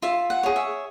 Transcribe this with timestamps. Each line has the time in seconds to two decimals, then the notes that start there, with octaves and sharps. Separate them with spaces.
0.02 F4 E5
0.30 F#5
0.43 G#4 C#5
0.56 E5